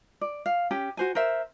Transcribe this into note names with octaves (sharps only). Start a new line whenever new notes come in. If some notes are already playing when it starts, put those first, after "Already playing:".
D5
F5
C#4 G4
F#4 C5 G#5
A#4 C5 E5